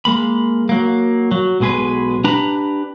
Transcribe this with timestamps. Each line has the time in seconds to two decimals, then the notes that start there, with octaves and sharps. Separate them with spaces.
0.05 G#3 A#3 B5
0.69 F#3 A#3
1.31 F#3
1.60 B1 B2 G#3 G#4 B4
2.24 D4 G4 B4 A#5 B5